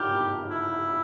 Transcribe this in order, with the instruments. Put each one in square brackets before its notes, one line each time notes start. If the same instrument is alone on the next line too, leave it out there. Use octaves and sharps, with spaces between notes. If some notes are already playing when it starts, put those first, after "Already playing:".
Already playing: [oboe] G4 [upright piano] F6 G6
[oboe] E4